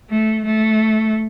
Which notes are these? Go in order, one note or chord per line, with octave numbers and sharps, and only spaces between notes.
A3
A3